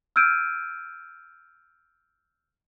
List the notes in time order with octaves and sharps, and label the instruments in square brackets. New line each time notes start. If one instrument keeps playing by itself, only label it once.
[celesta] E6 F6 G6 G#6 D7 D#7